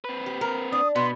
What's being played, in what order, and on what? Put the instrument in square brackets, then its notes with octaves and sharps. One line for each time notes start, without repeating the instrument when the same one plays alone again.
[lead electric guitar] C4 B4
[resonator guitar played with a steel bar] G4
A#4
[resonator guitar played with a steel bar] D4 [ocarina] D#6
[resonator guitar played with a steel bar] B2 [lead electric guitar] B3 [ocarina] C6